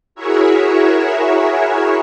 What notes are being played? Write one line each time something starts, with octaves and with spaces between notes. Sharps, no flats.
E4 F#4 G#4 A#4 C#5 E5